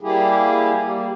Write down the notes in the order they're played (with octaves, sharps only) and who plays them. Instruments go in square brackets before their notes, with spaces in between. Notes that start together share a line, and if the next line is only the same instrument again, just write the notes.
[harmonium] G3 A#3 E4 G4 G#4
G3 A#3